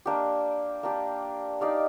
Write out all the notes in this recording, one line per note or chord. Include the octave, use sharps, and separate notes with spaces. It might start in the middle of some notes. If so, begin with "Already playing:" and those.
A#3 D4 G4
A#3 D4 G4
D#4 G4 D5 F5